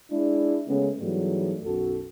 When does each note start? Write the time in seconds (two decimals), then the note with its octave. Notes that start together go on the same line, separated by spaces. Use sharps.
0.11 G#3 D4 E4
0.68 C#3 G#3 A3 B3 C#4
1.00 G#2 E3 F#3 G3 A3 B3
1.64 B1 F#2 F#4 A4